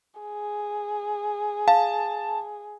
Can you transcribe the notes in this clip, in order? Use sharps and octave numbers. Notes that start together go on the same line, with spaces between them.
G#4
F5 A5